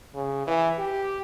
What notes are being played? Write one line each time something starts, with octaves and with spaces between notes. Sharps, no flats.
C#3
E3
G4